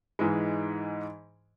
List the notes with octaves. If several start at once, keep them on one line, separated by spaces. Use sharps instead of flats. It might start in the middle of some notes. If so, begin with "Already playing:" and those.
G#2 E3 G#3